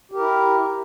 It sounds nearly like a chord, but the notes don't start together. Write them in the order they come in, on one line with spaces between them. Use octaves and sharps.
G4 A#4 E4